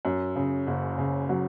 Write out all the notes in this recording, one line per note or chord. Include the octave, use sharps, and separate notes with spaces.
F#2
C#3
F#1
C#3
F#3